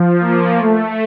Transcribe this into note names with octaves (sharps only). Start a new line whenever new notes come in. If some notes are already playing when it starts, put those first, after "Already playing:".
Already playing: F3
A#3
A3